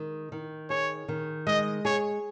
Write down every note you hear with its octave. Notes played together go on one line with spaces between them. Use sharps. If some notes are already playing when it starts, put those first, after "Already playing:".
Already playing: D#3 G#3
D#3
G#4 C#5
D#3
G#3 D#5
G#4 C#5